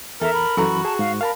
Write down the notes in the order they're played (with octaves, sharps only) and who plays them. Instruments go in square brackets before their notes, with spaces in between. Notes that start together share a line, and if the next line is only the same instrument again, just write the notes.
[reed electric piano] E2 A#5 [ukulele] A4 [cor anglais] A#4 [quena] E5
[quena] B5
[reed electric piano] F#2 E3 [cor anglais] F#4 [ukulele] A4 A#5
[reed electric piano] G#4 [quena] A5
[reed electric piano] G#2 [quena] F5
[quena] A#4 [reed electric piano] F5 A5 B5